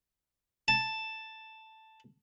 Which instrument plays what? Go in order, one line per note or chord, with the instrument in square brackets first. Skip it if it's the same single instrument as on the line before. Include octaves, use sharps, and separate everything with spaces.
[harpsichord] A5